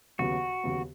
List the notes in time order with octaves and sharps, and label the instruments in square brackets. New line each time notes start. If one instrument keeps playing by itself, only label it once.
[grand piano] D#2 C#3 F#3 B3 [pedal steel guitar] F#4
[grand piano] D#2 C#3 F#3 B3